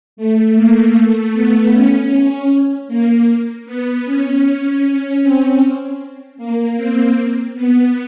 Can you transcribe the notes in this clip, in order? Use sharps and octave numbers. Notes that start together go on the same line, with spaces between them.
A3
A#3
A3
B3
C#4
C#4
A#3
B3
C#4
C#4
C#4
C4
A#3
C4
B3